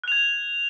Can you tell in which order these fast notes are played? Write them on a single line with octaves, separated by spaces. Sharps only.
F#6 F7 G#6